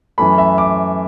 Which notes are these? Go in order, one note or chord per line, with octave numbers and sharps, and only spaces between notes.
F#2 E3 A3 B5
E5
D6